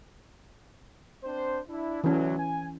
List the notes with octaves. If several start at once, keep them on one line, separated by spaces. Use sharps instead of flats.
C4 D4 C5
D4 E4
D2 E3 F#3 C#4
G#5